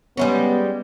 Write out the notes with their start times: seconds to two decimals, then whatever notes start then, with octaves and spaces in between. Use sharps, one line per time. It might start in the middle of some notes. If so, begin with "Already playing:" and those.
0.17 G3 G#3 B3 C#4